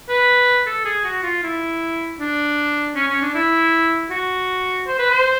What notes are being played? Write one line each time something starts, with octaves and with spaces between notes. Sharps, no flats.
B4
A4
G#4
F#4
F4
E4
D4
C#4
C#4
D4
E4
F#4
C5
B4
C5